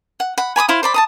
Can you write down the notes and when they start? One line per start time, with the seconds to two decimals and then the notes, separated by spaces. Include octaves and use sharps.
0.20 F#5
0.38 F#5 B5
0.56 G#5 B5 D6 D#6
0.68 E4 C5 F5
0.83 C5 D5 B5
0.94 A5 A#5 D#6